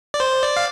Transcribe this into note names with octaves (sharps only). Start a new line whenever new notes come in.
D5
C5
D5
F5